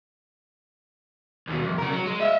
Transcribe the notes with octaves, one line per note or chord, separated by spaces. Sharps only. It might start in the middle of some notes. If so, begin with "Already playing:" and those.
D#2 B2
C2 F2
C#3 A#4
F#3
G#3
D#5 E5